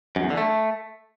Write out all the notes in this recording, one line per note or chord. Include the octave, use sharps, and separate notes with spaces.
F#2
E2
D3
A3